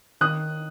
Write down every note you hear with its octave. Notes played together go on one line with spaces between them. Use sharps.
D#3 D#6 F#6